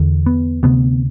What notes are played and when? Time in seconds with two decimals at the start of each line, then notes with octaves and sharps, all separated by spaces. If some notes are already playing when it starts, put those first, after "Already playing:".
Already playing: E2 D3
0.26 B3
0.63 D2 C3 B3